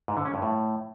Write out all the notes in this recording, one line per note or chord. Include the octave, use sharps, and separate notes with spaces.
G#2
D3
C#4
G2
A2